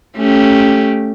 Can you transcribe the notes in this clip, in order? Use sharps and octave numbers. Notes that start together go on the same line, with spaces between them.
A3 C#4 G4